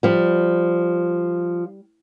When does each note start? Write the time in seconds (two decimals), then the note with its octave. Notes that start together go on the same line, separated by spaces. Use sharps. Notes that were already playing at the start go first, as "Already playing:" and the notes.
0.03 F3 G3